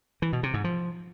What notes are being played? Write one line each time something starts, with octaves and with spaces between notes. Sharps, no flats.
E3
B2
C3
G#2
F3